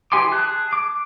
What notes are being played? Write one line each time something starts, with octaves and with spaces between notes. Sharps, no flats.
E3 G4 G#5 C6 D6
G#4 A5 F#6
D6